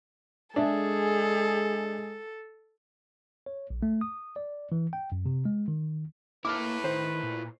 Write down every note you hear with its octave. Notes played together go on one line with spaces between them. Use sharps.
G#3 D4 G#4 A4 E5
C#5
A#1
A3
D#6
D5
E3
G5
F#2
C3
G#3
D#3
A#3 E4 A4 B4 D6 F6
D#3 C5
A#2